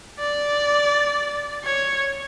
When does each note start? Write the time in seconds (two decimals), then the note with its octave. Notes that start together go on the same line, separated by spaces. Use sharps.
0.19 D5
1.64 C#5